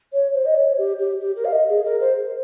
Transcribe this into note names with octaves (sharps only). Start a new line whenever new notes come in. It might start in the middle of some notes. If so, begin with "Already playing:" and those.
C#5
C5
D#5
C#5
G4
G4
G4
A#4
F5
D#5
G#4
A#4
C5